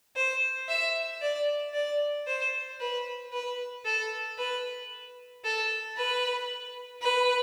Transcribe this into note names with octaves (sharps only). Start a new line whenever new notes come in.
C5
E5
D5
D5
C5
B4
B4
A4
B4
A4
B4
B4